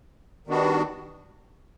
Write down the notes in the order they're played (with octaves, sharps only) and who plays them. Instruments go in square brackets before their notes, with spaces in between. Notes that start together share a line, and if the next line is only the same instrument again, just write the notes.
[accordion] D#3 G3 B3 D4 F#4